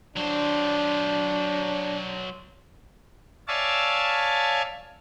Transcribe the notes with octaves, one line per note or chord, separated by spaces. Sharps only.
F#3 D4 C5
C#5 D5 E5 F5 G#5 A5